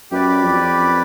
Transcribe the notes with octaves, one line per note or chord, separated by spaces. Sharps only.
F#2 G4 B4 D5
F2